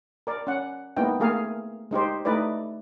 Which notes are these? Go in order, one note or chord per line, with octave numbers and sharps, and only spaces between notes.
A#4 D5
C#4 F#5
G#3 A#3 B3 D#4 E4 G5
A3 A#3 G#4 A#4 F5
G#3 D#4 G4 C5
A3 D#4 E4 B4 D5